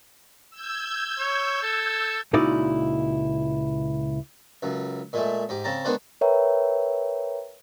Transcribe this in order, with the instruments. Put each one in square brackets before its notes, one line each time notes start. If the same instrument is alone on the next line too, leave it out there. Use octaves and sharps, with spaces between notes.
[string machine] E6 G6 G#6
[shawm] C#5
A4
[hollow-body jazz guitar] C#2 A#2 D#4 E4 F#4 D5
[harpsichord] C#2 F#2
A#2 G#3 A3
G#2 G4
C#3 C4 A5 A#5
D#3 G#3 B3 D4 B4 C5
[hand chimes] A#4 B4 C#5 E5 G5 A#5